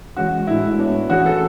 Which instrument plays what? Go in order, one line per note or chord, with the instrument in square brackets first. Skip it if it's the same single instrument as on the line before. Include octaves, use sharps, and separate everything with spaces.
[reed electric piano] E3 G#3 C#4 [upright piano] F#4
[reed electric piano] A2 G#3 D4 F#4 [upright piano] E4
[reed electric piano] B3 D4 F#4 C#5
[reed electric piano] E3 A3 C#4 G#4 [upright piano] F#4
[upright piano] A4